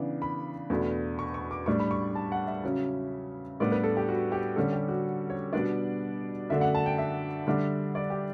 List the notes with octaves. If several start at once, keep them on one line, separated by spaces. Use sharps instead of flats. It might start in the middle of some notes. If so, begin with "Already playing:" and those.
Already playing: C#3 E3 B3 D4
B5
E2 B2 A3 D4
C#6
C#6
D6
A2 G3 D4 C#6
B5
C#6
A5
F#5
E5
C#3 F#3 C#4
A2 G3 B3 D4 D5
B4
A4
G4
F#4
G4
D3 G3 C#4 A4
G4
F#4
C#5
B2 G3 B3 D4 D5
F#2 D3 A3 D4 E5
F#5
A5
G5
E5
D3 G3 D4
D5
G4